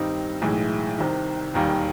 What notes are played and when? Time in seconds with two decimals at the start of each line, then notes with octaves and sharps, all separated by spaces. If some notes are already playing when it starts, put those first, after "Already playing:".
Already playing: G2 D#3 G3 C4 D#4
0.42 B1 A2 E3 G#3
0.98 C2 C3 D#3
1.54 E1 D#2 D#3 G3 A#3